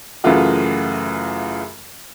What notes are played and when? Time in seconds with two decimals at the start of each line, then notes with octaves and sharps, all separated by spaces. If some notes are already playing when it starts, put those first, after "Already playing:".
0.24 F#2 C#3 E3 A3 F4 F#4